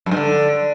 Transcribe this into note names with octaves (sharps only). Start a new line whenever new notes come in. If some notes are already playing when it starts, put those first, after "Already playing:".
F#2
G2
D3